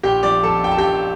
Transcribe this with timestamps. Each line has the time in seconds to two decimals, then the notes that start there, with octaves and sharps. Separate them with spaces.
0.03 A#1 G4 G5
0.23 F3 D5 D6
0.43 A#1 A4 A5
0.64 A#2 G5
0.71 A5
0.78 G4 G5
0.84 A#1